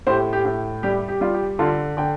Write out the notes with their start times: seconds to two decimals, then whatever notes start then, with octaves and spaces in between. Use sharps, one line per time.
0.07 A2 G4 C5
0.33 G4
0.45 A2
0.83 G3 G4
1.08 G4
1.21 G3 F4
1.34 G4
1.59 D3 F4 A4
1.97 D3 G5